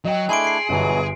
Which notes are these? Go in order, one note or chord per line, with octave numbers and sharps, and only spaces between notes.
F#3 D#5 G5
A3 D4 E4 G#4 G#5 C6 D7
C7 D7
G1 B2 E3 F#3